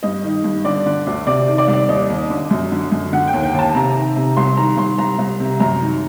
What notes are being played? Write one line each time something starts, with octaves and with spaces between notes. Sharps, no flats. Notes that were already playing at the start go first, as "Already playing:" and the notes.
G2 D#5
D#3
G2
D3 D5
D3
D2
C3 D5
D#3
D5
C2
D5
D#2 D#5
D#2
D3
F#2
D3
F#2
D3 F#5
G5
D#2
G5
D#2 A5
C3 A#5
D#3
C3
C2 C6
D#3 A#5
C2 C6
C2 A#5
C2
C3
F#2 A#5
D#3